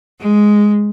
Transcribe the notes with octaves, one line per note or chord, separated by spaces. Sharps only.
G#3